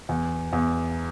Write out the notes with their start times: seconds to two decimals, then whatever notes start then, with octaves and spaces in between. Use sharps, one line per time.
0.09 E2
0.53 E2